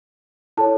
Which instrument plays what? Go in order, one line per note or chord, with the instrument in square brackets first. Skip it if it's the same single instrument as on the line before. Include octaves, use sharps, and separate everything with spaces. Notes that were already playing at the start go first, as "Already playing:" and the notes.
[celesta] E4 A4 C#5 A5